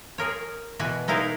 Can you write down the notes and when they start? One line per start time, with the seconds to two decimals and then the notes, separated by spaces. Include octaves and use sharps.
0.18 G#4 A#4 C#5
0.79 B2 E3 F#4 G#5
1.08 G#3 D#4 E4 A#4 F5